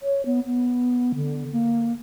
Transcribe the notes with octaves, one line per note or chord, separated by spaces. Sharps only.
C#5
B3
B3
D3
A#3